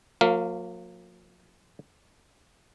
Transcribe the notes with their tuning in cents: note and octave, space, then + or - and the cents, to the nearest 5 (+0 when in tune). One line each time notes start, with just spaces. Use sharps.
F3 +45 A#3 -25 F5 +0